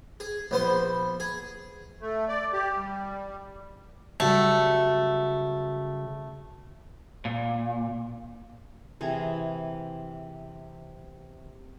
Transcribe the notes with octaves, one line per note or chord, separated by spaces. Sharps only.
G#4
A#1 B3 C5 C6
G#4
A3
D5
G4
G3
C#3 F#3 G3 A3 F#4
A#2
C3 E3 G#4 A#5